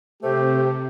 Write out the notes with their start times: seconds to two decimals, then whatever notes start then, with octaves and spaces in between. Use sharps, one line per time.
0.23 C3 A3 G4 C5